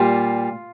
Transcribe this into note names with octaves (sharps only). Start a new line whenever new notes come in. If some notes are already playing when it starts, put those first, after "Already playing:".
Already playing: A#2 G3 F4